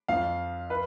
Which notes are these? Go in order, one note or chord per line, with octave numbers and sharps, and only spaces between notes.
F2 F3 F5
B4